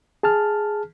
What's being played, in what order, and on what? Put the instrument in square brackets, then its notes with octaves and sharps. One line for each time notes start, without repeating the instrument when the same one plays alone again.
[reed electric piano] G#4 A5 F6